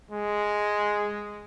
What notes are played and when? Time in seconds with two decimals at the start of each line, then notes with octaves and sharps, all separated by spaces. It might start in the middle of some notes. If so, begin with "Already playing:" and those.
0.11 G#3